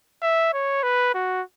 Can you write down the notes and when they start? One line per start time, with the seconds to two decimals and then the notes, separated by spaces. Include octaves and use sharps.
0.22 E5
0.54 C#5
0.83 B4
1.15 F#4